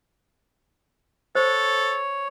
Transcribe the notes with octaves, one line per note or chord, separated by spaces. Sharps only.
A4 C5 C#5